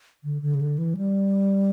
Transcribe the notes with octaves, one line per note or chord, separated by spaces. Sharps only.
D3
D3
C#3
D3
E3
G3